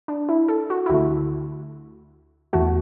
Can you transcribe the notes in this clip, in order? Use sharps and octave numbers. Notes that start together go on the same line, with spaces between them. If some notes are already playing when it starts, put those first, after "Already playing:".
D4
E4
A4
F#4
E4
D2 D3 A3 F#4
E2 E3 A3 F#4